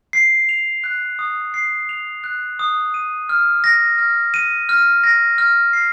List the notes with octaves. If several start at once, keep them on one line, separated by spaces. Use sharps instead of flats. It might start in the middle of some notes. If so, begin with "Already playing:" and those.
C7
F7
F#6
D#6
C7
F7
F#6
D#6
D#7
F6
A#6
F6
D#7
F6
A#6
F6
C7